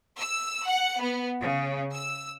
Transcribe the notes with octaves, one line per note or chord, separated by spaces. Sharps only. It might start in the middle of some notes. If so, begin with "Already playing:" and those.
E6
F#5
B3
C#3
E6